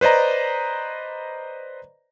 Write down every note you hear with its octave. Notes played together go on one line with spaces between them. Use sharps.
B4 C5 D5 D#5 A#5